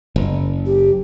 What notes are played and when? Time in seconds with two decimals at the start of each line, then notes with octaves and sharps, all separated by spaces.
0.16 F#1
0.65 G4